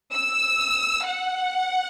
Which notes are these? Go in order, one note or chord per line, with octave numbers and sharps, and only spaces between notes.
E6
F#5